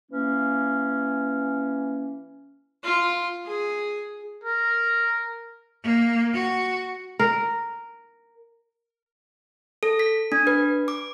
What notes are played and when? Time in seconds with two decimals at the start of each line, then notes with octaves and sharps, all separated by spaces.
0.12 E3 A#3 C#4
2.83 F4
3.46 G#4
4.44 A#4
5.84 A#3
6.33 F#4
7.19 A#4
9.83 A4
9.99 B6
10.32 D4
10.47 B4
10.88 D6